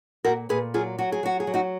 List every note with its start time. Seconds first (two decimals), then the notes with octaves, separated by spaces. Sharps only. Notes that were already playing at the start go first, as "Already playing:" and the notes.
0.24 A#2 F#4 A#4
0.49 A#2 G#4 B4
0.74 F#3 F4 G#4
0.98 F#3 F#4
1.12 G#4
1.23 F#3 F#4
1.40 G#4
1.47 F#3
1.54 D#4 F#4